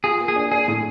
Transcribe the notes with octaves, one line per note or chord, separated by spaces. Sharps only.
F4 G#4
A#3
G#4
D4
D4 G#4
A2